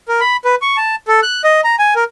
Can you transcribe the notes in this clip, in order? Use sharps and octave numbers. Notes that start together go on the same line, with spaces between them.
A#4
B5
B4
C#6
A5
A4
F#6
D#5
A#5
G#5
A#4